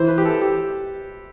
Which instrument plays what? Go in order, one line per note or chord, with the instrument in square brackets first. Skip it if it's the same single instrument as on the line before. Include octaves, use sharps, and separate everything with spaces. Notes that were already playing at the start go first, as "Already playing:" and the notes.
Already playing: [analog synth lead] E3 [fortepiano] C5
[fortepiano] B4
G4
A4
G4